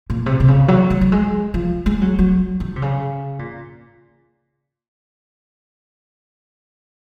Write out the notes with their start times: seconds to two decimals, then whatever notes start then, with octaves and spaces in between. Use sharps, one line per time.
0.10 A#2
0.26 C3
0.40 C3
0.48 C#3
0.68 F#3
0.90 F#3
1.01 F#3
1.12 G#3
1.54 F3
1.86 G#3
2.01 F#3
2.19 F#3
2.60 D#3
2.76 C3
2.82 C#3
3.39 A#2